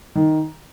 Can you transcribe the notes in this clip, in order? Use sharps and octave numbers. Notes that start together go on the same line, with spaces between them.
D#3